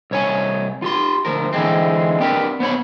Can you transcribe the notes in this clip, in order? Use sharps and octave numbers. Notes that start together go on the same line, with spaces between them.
C2 C#5 G#5
F4 G4 C6
D2 F3 A#4
D3 E3 G3 G#3 C4
C4 D4 G4 A#4 B4
B3 C5 C#5 B5